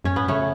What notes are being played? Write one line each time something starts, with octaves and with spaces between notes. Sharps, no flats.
F#2 C#4
A2 B3
C#3 A3 C#4